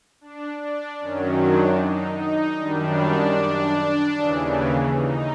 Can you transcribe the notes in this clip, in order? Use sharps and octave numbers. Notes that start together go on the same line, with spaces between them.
D4
D4
F#2 D#3 F#3 C#4
D4
D#4
D#4
F#2 D#3 G3 D4
D#2 C#3 E3
D#4